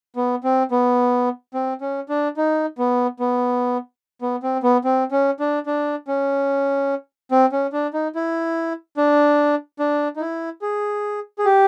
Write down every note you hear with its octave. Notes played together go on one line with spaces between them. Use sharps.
B3
C4
B3
C4
C#4
D4
D#4
B3
B3
B3
C4
B3
C4
C#4
D4
D4
C#4
C4
C#4
D4
D#4
E4
D4
D4
D#4
E4
G#4
G#4
G4